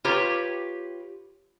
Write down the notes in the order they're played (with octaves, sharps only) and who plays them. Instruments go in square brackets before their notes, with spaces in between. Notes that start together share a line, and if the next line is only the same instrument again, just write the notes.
[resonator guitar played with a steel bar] F4 G4 B4 C#5 A#5